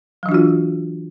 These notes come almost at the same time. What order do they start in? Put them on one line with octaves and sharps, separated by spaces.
F#3 E3 D4 F#4 F4